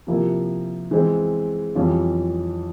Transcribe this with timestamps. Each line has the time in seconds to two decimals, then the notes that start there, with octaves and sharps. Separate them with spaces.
0.07 C3 F3 A#3 E4
0.91 E3 G#3 C4
1.75 F2 E3 G3 C#4 F4